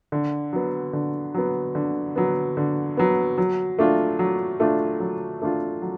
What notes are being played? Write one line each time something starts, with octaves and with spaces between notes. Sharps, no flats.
D3
F#3 B3
D3
F#3 B3
D3
F#3 B3
D3
F#3 B3
F#3
A3 D4 F4
F#3
A3 D4 F4
F#3
A3 D4 F4
F#3